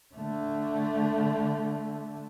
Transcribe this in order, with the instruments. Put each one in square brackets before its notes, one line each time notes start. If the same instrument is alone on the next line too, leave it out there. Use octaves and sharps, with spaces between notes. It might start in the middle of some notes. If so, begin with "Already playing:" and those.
[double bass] D3 A3